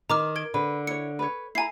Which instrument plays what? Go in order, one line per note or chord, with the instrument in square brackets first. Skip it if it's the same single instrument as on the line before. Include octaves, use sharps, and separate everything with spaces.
[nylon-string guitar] D#3 [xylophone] A#5 D6 F6
[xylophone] A#4 G#6 D7
[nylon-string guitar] D3 [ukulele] B4
[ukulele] E4 C#5 [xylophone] C#7
[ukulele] B4 C#5
[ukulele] E4 F#5 A#5 [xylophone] G#5 C7